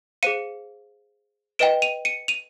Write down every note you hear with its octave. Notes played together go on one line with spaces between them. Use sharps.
G#4 C5 F5 C#7 D#7
B4 D#5 G5 D7 E7
D#7 F7
C#7 D#7
D#7 F7